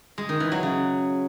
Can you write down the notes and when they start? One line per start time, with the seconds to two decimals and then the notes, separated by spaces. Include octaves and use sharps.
0.18 G#3
0.29 D#3
0.40 E3
0.52 F#3
0.63 C#3